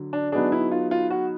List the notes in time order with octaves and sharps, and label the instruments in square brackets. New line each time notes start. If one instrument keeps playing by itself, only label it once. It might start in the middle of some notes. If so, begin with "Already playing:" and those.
Already playing: [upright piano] D3 F#3
[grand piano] D4
[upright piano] F#3 B3 D#4 G#4 [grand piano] D4
[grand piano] E4
F4
F4
F#4